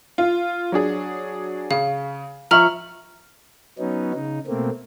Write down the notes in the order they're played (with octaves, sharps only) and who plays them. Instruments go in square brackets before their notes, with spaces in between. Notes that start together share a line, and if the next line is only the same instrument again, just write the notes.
[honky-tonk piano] F4
F#3 D4 G#4
[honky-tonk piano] C#3 [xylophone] F5
[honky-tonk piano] F3 E5 C#6 [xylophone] A#5 F6 F#7
[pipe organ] F#3 B3 C#4 D#4
C#3 D#4
B2 A3 A#3 C4